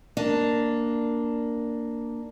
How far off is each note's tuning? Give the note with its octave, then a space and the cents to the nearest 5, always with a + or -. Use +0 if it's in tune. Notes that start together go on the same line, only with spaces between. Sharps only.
A#3 +0 D4 +0